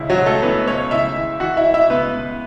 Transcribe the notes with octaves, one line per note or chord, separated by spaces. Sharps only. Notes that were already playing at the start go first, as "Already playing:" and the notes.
Already playing: C#2 C#3 E4
F#3 F#4
C#2
A3 A4
E3 B3 B4
C#2 C#4 C#5
C#3 E4 E5
E3
E3 F#4 F#5
E4 E5
E3
E4 E5
C#2 B3 B4
C#2